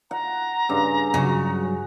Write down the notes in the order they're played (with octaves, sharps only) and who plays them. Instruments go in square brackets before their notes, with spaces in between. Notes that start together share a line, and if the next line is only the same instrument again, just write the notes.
[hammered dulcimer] F#5 [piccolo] A#5
[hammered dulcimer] G2 C#3
[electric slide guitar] G2 F#3 [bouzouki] C#3 [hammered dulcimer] F#4